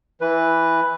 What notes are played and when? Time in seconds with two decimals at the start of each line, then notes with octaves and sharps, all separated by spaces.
0.21 E3 B4